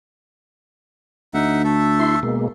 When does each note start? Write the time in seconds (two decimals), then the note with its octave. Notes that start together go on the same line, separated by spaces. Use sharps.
1.34 D2 D#4 E5 F#5
1.64 A3 A4 E5
1.99 E4 C6
2.23 B2 G#3 A#3